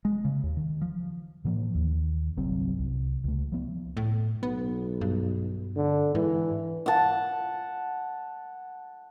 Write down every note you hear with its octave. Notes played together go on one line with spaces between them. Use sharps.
G#3
C#3
D#2
D#3
F3
A2 E3 F3 A#3
D#2
G1 C2 F#3 C4
C2
C#2 A3
F3 B3
A2
B1 B3
G2
D3
G#2 E3
F#5 A5